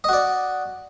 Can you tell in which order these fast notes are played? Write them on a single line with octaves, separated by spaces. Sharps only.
D#5 F#4 D5